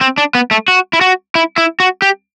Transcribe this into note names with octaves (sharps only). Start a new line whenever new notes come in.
C4
D4
B3
A3
F#4
E4
F#4
E4
E4
F#4
G4